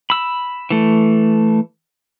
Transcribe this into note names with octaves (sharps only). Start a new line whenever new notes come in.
B5 E6
E3 A3